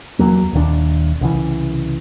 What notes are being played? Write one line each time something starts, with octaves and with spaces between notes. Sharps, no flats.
E2 F#3 A#3
D#1 D#2 C#3 D4
C2 C#3 E3